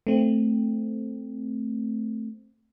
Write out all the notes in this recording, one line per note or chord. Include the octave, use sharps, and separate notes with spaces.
A3 C4